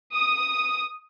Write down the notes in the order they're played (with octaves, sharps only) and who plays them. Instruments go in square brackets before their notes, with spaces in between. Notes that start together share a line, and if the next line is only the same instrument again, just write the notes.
[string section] D#6